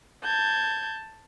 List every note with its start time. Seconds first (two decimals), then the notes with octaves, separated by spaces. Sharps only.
0.23 A5 G6 G#6